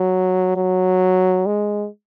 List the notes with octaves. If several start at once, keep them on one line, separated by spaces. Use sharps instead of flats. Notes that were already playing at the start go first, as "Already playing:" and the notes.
Already playing: F#3
F#3
G#3